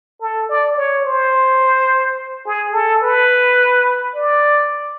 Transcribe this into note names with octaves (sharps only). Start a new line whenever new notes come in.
A4
D5
C#5
C5
G#4
A4
B4
D5